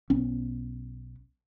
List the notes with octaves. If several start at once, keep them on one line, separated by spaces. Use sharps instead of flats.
B1 B3 C#4